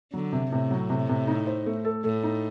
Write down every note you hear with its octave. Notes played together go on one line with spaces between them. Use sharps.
D3 F#3
C3
A2 C3
F#3
C3
C3
D#4
C5
A3
A4
A2 A4
D#4